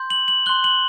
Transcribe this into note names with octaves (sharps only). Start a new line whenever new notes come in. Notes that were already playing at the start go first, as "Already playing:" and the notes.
Already playing: C6 G6
F#7
F#7
C6 F#6 G7
F#7